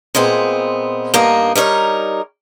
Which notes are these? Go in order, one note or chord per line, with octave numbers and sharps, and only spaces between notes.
A#2 G#3 B3 C4
G2 A#3 B3 D#4
G3 D#4 A#4 C#5